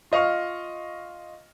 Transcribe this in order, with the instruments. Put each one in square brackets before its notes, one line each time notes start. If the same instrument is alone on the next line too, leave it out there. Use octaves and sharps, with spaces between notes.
[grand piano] F4 D#5 F5 C#6 F6